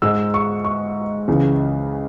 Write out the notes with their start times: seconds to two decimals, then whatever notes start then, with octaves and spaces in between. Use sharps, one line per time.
0.02 G#2 G#3 E6
0.34 C#6
0.65 C#6
1.28 C#2 C#3 E3 G#3